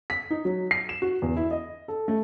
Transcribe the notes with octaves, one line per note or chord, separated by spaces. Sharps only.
B6
D#4
F#3
C7
E7
F#4
E2
E4
D#5
A4
A3